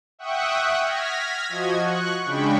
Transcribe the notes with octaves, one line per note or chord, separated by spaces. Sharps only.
E5 F#5 G5 C#6 D#6 F#6
F6 G#6 A#6 B6
F3 F#4 D#5 G#6
C#6 F#6
C#3 G#3 D4 G5 B5 C#6